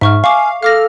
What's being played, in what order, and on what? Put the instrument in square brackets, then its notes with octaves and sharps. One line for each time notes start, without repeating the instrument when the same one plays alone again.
[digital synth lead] G#2 [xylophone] E5 C#6 F6
[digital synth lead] F5 [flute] G#5 [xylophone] C#6 D6
[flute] A4 [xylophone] F5 D6 A#6 [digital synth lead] F6